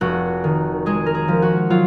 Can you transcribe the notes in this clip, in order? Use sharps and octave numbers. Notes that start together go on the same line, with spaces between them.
F1 F#4
D#3
G#3 G#4
A#4
G#4
F3
F#4
F#3 F4